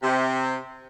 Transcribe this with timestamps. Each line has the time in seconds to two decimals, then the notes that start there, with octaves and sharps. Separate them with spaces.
0.03 C3